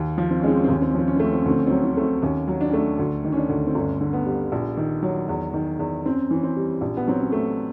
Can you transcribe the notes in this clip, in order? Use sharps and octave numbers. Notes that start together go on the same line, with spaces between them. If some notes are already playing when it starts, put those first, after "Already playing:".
Already playing: D#2
F3
C4
C#4
G#3 C4
C#4
C4
D#2
C#4
C4
C#4
F3 C4
C#4
A3 C4
C#4
C4
C#4
D2 C4
C#4
C4
F#3
C#4
C4
C#4
A3 C4
D#2 C#4
F#3
D4
C#4
A3 D4
D2 D4
D#3
C#4
D4
D2
C4
G1 C#4
D3
B3
G3
A#1
D#3
F#3
E2
D#3
E2
F#2 C4
E3 C#4
C4
G3
A#1
B3
F#3 C4
C#4
A3